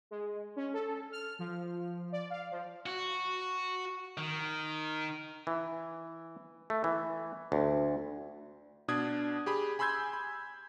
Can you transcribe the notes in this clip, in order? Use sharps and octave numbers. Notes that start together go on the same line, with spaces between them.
G#3
C#4
A4
F6
F3
D5
F5
F3
F#4
D#3
E3
A3
E3
D2
B2 D4 D#6 G#6
G4 G#4 B5
G#5 B5 C6 E6 G6 G#6
B5